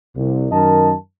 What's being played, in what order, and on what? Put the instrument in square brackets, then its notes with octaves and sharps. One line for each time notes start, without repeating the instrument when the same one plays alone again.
[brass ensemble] C2
F#2 D#3 A#4 D#5 A5